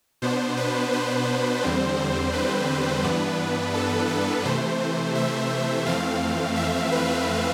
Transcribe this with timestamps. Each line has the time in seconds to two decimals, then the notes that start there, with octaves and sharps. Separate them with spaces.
0.22 B2 B3 D4 C5
0.57 B4
0.93 C5
1.63 E2 D3 G3 C4
2.33 B4
3.04 G2 E3 B3 D4
3.74 A4
4.09 B4
4.45 C3 E3 A3 C5
5.15 E5
5.86 F2 E3 A3 C4 F5
6.56 E5
6.92 B4